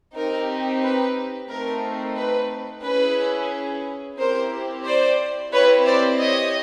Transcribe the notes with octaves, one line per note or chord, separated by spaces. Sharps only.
C4 D#4 G4 A#4
B4
A3 C4 D#4 A#4
B4
C#4 E4 G#4 B4
C4 E4 G4 A#4 C5
C5 D5
C4 E4 G4 B4 C#5
C5 D5
C#5 D#5